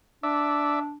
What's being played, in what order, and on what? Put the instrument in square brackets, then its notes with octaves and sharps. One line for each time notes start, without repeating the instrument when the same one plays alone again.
[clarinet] D4 [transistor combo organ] D5 E5